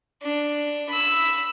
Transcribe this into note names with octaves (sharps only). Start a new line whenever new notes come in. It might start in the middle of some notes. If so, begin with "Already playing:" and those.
D4
B5 E6